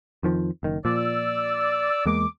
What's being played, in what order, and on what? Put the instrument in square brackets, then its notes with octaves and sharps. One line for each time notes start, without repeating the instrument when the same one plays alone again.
[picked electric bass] F2 D#3 F3
F#1 D#3
[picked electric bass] A#2 F3 [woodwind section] D5 E6
[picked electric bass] E2 G#3 A#3 [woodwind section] D6